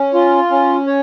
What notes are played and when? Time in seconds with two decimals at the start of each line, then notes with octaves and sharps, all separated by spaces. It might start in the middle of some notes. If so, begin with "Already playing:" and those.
Already playing: C#4
0.14 F4
0.51 C#4
0.87 C#5